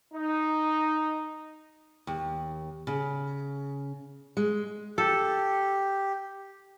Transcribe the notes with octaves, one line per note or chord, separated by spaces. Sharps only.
D#4
D#2
C#3
G#3
G4 A4